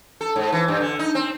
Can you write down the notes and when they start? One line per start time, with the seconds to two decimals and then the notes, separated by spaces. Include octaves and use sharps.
0.21 A4
0.36 G#2
0.53 E3
0.68 G2
0.81 D3
0.99 D#4
1.15 C4